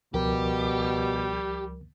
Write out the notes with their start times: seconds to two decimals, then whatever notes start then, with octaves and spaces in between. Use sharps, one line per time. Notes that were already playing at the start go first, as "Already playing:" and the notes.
0.14 C#2 B2 F3 G3 G4 A#4